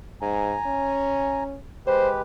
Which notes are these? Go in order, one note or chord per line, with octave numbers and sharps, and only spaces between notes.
G#2 G#5 A#5
C#4
G#3 G4 B4 C5